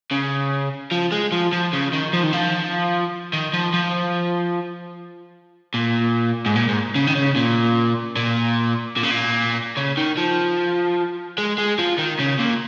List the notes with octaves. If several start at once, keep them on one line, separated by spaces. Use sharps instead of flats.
C#3
F3
G#3
F3
F3
C#3
D#3
F3
D#3
F3
D#3
F3
F3
A#2
G#2
A#2
G#2
C#3
D#3
C#3
A#2
A#2
A#2
C#3
A#2
C#3
D#3
F3
G#3
G#3
F3
D#3
C#3
A#2